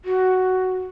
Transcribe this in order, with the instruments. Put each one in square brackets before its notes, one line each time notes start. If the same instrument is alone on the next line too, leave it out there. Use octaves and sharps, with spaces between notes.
[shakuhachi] F#4